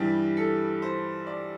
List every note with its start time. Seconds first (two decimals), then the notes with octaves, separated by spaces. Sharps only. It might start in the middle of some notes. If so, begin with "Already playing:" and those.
Already playing: G2 E3 G3 G4
0.37 A4
0.82 C5
1.27 D5